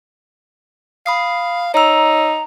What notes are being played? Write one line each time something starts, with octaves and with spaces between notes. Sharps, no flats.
F5 B5 D#6 C7
D#4 C#5 A#5 E6